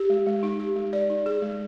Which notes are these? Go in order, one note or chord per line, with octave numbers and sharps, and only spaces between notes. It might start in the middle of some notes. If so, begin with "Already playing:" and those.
Already playing: G4
G#3
G#3
D#4
G4
G#3
D5
D#4
G#4
G#3